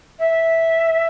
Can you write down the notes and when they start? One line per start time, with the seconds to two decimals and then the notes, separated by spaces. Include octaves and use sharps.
0.19 E5